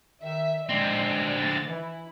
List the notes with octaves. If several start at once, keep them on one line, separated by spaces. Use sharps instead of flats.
D#3 E5
D3 G#3 C4 D5
A3 A6
E3 E4